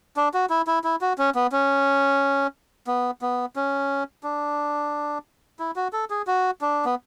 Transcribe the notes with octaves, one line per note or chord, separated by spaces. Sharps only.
D4
F#4
E4
E4
E4
F#4
C#4
B3
C#4
B3
B3
C#4
D4
E4
F#4
A4
G#4
F#4
D4
B3